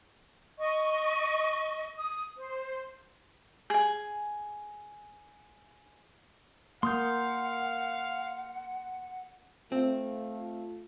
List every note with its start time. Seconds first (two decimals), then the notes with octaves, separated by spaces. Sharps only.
0.59 D#5 C#6
1.97 D#6
2.37 C5
3.70 G#4 G#5
6.83 A#3 F5 F#5 C6 D#6 G6
9.72 A3 C4 F4